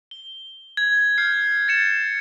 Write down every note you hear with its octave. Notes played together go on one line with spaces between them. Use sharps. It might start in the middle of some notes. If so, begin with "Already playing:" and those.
G7
G#6
F6 G6 C7
A6 C#7 E7